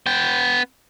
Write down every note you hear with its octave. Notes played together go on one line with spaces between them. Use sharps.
B3 G5